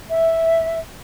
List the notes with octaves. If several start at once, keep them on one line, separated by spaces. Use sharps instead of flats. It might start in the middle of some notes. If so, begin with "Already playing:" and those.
E5